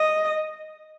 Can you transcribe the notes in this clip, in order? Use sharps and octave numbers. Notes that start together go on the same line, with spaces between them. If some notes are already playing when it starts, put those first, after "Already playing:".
Already playing: D#5